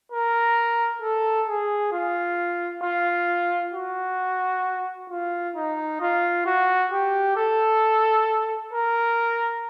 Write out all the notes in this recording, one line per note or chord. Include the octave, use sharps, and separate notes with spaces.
A#4
A4
G#4
F4
F4
F#4
F4
D#4
F4
F#4
G4
A4
A#4